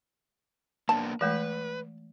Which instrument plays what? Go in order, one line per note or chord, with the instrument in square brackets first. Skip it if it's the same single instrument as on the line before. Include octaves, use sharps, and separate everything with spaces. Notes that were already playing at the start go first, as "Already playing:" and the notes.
[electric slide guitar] A#3 B3 D4 [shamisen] A5
[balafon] E3 G#3 A3 [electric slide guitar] B4